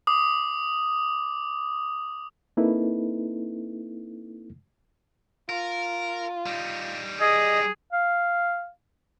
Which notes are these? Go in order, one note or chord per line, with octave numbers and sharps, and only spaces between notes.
D6 D#6
A#3 C4 D#4 E4 A4 B4
F4 A#4
G3 D#4
G#4 D#5 D#6
F5